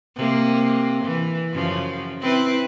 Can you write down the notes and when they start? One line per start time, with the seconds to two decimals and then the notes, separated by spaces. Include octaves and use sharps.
0.16 C3 A#3
1.05 E3
1.53 F#2 C#3 F3
2.21 C4 E4 B4